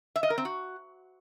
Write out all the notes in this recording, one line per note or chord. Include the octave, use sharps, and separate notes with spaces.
E5
D#5
A#4
C4
F#4